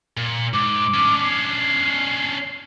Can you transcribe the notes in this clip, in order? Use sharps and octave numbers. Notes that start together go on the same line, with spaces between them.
A#2
G#2 D6
C#4 D4
C7